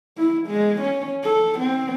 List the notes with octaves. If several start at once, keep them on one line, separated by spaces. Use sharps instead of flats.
E4
G#3
C#4
A4
C4